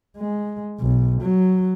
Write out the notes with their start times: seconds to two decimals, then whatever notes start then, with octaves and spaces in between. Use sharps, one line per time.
0.17 G#3
0.81 B1
1.22 F#3